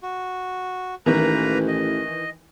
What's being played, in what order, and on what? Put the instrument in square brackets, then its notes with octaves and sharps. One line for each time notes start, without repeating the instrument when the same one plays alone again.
[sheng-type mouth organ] F#4
[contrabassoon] A1 [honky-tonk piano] D#3 E3 [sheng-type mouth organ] A#3 B4 A#5
[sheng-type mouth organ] D#5